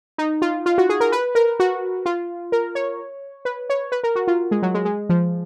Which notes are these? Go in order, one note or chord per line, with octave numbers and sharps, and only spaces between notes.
D#4
F4
F4
F#4
G#4
A#4
B4
A#4
F#4
F4
A#4
C#5
B4
C#5
B4
A#4
F#4
F4
G#3
F#3
G#3
G#3
F3